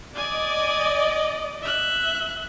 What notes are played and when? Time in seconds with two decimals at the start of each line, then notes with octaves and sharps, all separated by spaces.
0.16 D5 D#5 G#5
1.62 E5 F#6